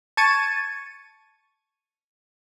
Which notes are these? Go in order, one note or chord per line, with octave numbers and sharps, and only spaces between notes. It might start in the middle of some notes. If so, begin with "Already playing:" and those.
A5 C#6 G#6 A6 C#7 D#7